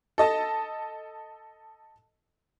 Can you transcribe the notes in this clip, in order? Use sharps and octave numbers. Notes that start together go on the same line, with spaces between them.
A4 D#5 A5